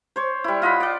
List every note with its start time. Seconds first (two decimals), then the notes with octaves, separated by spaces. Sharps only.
0.16 C5 C#5
0.44 G3 E4
0.62 F4 D#5 F#5 B5
0.80 D5 F#5